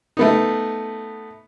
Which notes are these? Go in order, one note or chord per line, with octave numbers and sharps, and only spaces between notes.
A3 B3 D#4